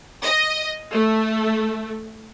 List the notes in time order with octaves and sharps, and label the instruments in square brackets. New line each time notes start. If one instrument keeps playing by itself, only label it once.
[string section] D#5
A3